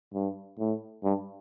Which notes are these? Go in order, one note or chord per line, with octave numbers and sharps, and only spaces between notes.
G2
A2
G2